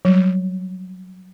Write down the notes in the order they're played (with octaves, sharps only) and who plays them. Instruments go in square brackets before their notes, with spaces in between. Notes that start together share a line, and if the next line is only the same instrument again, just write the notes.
[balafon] F#3 G3